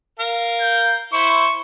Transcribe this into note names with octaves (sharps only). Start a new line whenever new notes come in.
A#4 F5
G6
E4 C5 C#6